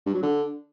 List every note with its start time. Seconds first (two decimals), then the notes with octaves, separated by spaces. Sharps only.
0.06 G2
0.14 F#3
0.23 D3